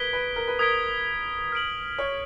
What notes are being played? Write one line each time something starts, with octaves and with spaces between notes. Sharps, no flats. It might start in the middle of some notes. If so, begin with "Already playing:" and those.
Already playing: A#4 B4 D#6 G#6 B6 D7 G7
B4
A#4
B4
A#4 D#6 G#6 B6 D7 G7
F6 G#6 B6 D7 F#7
C#5